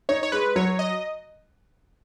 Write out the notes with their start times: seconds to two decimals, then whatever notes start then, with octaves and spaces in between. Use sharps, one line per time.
0.09 D#4 C#5
0.23 C#5
0.32 G#3 B4
0.56 F#3 C#5
0.79 D#5